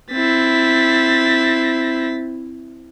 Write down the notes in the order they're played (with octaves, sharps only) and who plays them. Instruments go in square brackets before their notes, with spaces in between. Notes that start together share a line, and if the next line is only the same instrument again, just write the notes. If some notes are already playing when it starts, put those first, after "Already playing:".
[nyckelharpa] C4 E4 [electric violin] A6 B6